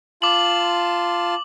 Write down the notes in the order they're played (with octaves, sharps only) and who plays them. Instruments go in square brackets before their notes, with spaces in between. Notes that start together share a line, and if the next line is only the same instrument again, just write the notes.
[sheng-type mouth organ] F4 A5 C6 [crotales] D6 F#7